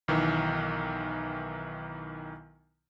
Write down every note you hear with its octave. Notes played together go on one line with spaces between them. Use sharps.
B1 D#3 E3